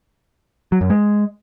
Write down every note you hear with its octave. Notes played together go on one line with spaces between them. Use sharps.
F#3
F#2
G#3